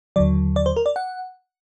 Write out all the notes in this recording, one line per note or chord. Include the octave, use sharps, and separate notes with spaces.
D#2 D3 F#3 D5
D5
C5
A#4
D5
F#5